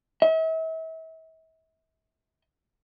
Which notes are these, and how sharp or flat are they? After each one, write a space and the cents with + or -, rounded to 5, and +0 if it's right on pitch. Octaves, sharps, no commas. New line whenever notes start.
E5 -40